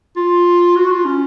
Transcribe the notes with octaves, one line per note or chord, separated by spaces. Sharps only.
F4
F#4
F4
C#4